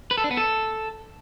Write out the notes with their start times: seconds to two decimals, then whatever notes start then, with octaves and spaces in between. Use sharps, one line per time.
0.11 B4
0.18 A4
0.24 D4
0.31 B3
0.37 A4